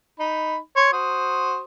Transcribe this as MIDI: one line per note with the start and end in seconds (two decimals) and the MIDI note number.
0.20 0.57 63
0.20 0.57 83
0.76 0.90 73
0.76 0.90 84
0.93 1.61 66
0.93 1.61 72
0.93 1.61 87